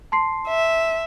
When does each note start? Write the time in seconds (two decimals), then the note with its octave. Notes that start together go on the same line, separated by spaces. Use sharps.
0.12 A5 C6 C7
0.48 E5